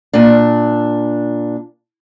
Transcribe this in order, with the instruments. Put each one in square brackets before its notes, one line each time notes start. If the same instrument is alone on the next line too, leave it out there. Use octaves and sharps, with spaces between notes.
[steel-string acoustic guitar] A#2 D4